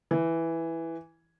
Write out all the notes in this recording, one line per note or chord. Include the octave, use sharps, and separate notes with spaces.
E3